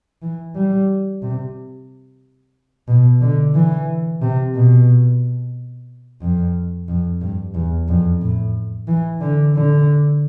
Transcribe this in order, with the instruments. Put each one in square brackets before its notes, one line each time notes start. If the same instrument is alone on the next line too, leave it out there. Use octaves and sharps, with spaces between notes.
[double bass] E3
G3
C3
B2
D3
E3
C3
B2
F2
F2
G2
E2
F2
A2
E3
D3
D3